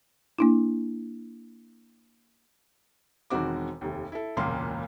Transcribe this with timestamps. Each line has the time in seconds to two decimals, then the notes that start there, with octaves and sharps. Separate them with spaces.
0.39 A#3 D4 E4
3.30 E1 D#3 G#3 C4 F#4 D6
3.81 F1 D#2
4.12 E4 A4
4.37 E1 C#2 A#2 A#3 F5 C6